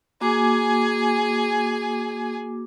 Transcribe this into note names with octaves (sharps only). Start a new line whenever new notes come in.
A#3 F#4 G#4 G#5 D6